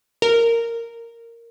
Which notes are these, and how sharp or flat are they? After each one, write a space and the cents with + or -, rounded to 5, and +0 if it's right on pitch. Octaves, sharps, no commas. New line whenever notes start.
A#4 -10